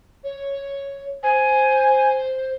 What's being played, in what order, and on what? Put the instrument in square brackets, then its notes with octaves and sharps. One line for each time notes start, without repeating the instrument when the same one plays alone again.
[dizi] C#5
[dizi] C5 [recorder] G#5